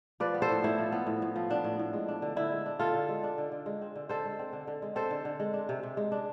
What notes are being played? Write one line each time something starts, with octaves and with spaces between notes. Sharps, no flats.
F3 B4 D5
B3
A4 C5
A2
A2 E4
F3
B3
A2
A2
F3
B3 D4
A2
A2
G#3
D4
D3
D3 E4
G#3
D4
D3 F4 A4
D3
G#3
D4
D3
D3
G#3
C4
D3
D3 A4 C5
G#3
C4
D3
D3
G#3
C4 A4 C5
D3
D3
G#3
D4
C3
C3
G#3
D4